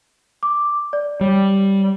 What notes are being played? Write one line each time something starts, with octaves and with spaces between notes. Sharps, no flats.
D6
D5
G3 C#5